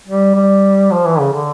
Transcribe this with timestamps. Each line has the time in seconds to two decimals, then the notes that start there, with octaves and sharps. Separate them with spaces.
0.08 G3
0.35 G3
0.91 F3
1.06 E3
1.20 C#3
1.33 D3